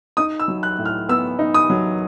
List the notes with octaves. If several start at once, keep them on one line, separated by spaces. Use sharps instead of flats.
D#4 D#6
E6
F#3
F#6
A2
F6
B3 E6
D#4
D#6
F#3